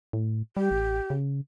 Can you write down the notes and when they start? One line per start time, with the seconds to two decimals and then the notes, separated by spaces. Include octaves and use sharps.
0.13 A2
0.57 G3 G4
0.71 A1
1.10 C#3